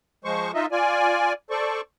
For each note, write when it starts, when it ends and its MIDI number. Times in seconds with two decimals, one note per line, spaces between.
0.25 0.52 53
0.25 0.52 56
0.25 0.52 72
0.25 0.52 85
0.54 0.66 63
0.54 0.66 65
0.54 0.66 75
0.54 0.66 76
0.72 1.33 65
0.72 1.33 74
0.72 1.33 80
1.50 1.81 69
1.50 1.81 72
1.50 1.81 74
1.50 1.81 85